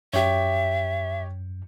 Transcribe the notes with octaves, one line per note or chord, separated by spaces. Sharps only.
F#2 G4 C#5 E5